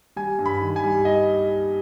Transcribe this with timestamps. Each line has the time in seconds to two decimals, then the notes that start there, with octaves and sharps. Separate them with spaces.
0.16 G3 G#5
0.39 G2
0.46 B5
0.61 D#3
0.76 G#5
0.84 G3
1.05 D#5